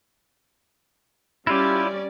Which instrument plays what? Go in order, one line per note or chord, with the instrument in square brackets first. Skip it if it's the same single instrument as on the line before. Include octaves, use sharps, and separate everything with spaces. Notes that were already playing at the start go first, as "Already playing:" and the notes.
[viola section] G3 C#4 D5 [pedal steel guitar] E4 F4 G4